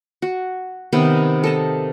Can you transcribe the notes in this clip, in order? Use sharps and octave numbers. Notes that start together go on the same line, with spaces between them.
F#4
C3 D#3 B3
A4 D#5 A5